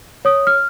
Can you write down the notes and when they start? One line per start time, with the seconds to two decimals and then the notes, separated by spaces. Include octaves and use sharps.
0.25 C#5 D#6
0.47 F6